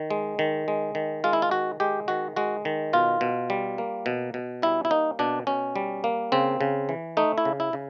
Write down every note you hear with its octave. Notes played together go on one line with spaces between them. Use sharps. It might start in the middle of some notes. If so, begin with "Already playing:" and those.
Already playing: D#3
G#3
D#3
G#3
D#3
G#3 F4
E4
F4
D#3 F#4
G#3 G4
D#3 F#4
G#3 F#4
D#3
B2 F4
B2
G3
A#3
B2
B2
G3 E4
E4
A#3 D#4
B2 D4
B2 C#4
G3
A#3
C#3 C4
C#3
E3
A3 D#4
E4
C#3
E4
C#3